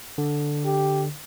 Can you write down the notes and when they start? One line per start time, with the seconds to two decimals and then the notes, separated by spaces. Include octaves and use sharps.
0.18 D3
0.65 G4